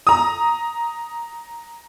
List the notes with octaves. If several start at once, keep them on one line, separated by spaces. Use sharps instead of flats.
A#5 D#6